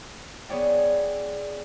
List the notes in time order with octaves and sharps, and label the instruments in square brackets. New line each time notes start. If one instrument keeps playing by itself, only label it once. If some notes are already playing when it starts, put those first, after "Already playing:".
[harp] B3 G#4 C#5 D5 G5